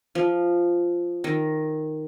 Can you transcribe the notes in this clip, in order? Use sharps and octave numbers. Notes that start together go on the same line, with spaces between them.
F3
D#3